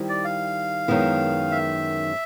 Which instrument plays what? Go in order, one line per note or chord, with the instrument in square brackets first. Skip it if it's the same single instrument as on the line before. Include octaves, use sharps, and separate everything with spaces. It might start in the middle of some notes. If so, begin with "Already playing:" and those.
Already playing: [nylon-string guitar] D#3 G3 C4 E4
[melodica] D5
F5
[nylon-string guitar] F#2 D#3 G#3 B3 E4
[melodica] E5